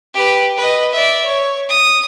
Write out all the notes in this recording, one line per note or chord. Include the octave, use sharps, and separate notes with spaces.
G4 B4
B4 D#5
D5 E5
C#5
D#6